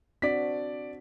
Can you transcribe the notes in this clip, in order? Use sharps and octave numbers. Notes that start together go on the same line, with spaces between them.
C4 D4 F#4 D5 B6